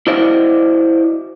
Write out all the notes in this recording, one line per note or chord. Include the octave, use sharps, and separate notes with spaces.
E4 F#4 C5 D5 D#5 F5